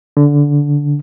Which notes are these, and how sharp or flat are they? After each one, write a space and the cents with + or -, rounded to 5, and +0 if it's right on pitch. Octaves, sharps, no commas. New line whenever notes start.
D3 -15